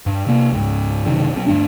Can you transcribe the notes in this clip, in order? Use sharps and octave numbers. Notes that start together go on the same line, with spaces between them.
G2
C3 A#3
C#2 G#2
F#1 C3 D#3
B1 C4
D2 G2 G3 D4